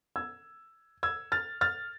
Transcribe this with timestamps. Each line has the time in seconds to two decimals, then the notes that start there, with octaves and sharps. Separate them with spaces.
0.16 E6 G#6
1.03 E6 G#6
1.32 F6 A6
1.61 F6 A6